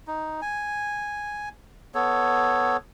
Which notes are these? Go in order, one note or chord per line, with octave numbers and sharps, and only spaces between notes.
D#4
G#5
B3 A4 C#5